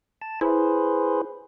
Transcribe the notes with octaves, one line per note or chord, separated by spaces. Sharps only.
A5
E4 G#4 B4 C5